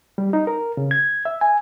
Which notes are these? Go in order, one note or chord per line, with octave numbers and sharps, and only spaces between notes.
G3
D#4
A#4
C#3
G#6
E5
G#5